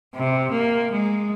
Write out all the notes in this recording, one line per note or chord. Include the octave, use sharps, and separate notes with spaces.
C3
A#3
G#3